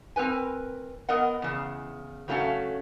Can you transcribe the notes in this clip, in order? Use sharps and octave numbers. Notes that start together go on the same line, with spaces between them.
C4 A#4 B4 G#5
B3 A#4 D#5 F#5
E2 C#3
C#3 F#3 A3 A#3 C#4 F5